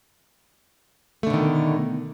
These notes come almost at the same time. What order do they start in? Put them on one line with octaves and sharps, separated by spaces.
A3 D3 B2 D#3